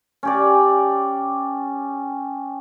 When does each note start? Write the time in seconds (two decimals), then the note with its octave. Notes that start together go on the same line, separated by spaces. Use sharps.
0.23 C#4 G4 D5